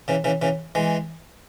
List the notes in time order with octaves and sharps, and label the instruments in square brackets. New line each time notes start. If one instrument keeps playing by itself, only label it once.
[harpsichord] C#3 E3
C#3 E3
C#3 E3
E3 G#3